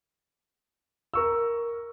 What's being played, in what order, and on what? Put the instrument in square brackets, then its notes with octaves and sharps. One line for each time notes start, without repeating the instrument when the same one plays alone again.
[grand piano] A#4 C#6 E6